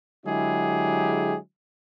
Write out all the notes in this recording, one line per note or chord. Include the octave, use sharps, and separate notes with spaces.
D3 F#3 G#3 E4 G4 G#4